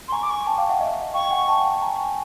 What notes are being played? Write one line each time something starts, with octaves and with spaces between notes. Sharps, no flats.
C6
G#5 A#5 C#6
D6
C#6
G5 A5
F5 G5
E5 F#5
D#5 F5
F5 G5 C#6
F#5 G#5
G5 A5
G#5 A#5